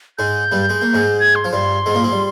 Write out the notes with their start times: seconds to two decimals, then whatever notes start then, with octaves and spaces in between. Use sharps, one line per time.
0.18 G#2 G#3 G6
0.52 G2 G3
0.69 G#3
0.81 A#3
0.94 G#2 G#3
1.20 G#6
1.35 C6
1.44 F3
1.52 G2 G3 C6
1.86 G#2 G#3
1.94 A#2 A#3
2.03 G#2 G#3
2.12 G3